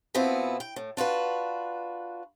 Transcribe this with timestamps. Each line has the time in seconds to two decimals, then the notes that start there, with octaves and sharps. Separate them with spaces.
0.14 B2 B3 C4 E4 F4
0.60 G5
0.76 A2
0.97 D4 F4 F#4 B4